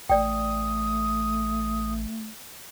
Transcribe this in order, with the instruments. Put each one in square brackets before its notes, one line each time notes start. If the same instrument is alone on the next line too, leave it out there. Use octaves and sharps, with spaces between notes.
[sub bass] A1 [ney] A3 [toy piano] D5 G5 [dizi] D#6